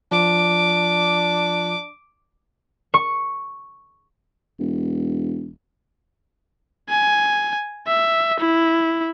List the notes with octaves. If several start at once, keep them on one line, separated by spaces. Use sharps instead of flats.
F3 D4 F4 D6
C#6
E1
G#5
E5
E4